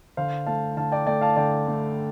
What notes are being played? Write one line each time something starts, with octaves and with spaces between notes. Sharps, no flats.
D3 C5 F5
A3 F5 A5
D3 F5 A5
D5 G5
A3 D5 G5
F5 A5
D3 D5 G5
A3